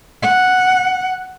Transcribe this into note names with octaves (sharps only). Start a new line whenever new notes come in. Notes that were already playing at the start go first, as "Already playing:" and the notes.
F#5